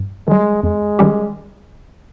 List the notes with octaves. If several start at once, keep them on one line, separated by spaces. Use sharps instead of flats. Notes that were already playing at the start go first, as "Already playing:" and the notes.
Already playing: G2
D#3 G3 G#3
F2 G#3
D#3 G3 C#4 G4